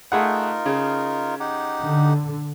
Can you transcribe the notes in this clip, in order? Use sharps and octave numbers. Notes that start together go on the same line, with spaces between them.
A3 D#4 F4 G#4 A#4 F#5
C#3
D#4 G4 F#5
D3